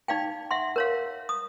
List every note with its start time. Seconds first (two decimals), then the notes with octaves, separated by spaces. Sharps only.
0.08 D#4 D5 F5 G5
0.51 E5 F#5 C6
0.76 A#4 C#5 F5
1.29 D#6